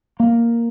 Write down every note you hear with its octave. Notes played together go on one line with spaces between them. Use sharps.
A#3